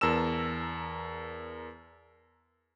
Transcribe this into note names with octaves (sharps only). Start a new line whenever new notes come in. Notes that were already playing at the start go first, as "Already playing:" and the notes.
E2 A#4 A5 E6 E7